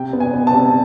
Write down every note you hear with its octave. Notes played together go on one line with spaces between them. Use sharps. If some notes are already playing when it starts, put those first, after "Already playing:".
Already playing: C3 G5
B3
G#5
B3
A5
C3